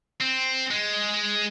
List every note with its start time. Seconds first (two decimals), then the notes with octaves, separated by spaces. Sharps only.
0.20 C4
0.71 G#3